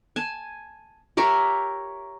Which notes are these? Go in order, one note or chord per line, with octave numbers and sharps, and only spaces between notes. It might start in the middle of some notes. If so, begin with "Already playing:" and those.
G#5 A5
G4 A#4 C#5 E5